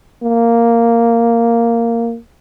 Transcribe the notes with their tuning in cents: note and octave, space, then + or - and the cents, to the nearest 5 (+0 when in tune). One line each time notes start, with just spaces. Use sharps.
A#3 -5